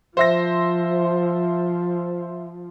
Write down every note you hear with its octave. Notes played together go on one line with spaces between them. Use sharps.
F3 C5 E5 A#6